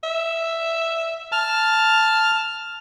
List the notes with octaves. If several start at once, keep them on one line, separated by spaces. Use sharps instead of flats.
E5
A5 F6